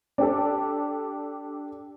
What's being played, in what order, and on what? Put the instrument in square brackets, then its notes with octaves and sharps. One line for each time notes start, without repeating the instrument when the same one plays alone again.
[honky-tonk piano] D4 G4 A4